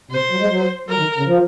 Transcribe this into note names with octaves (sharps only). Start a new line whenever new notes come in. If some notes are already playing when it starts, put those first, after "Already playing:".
C3 C5
F#3
G#3
F#3
F#3 A#4
D#3
C#3
F3